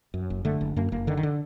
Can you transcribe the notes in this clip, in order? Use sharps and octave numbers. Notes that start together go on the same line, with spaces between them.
F#2
F#1
D3 A3
F#1
F#2 A#3
F#1 A#3
D3 D#3
D#3
D3